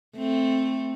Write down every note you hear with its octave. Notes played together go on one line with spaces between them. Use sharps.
A3 C4